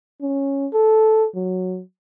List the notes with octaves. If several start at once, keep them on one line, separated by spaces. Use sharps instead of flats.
C#4
A4
F#3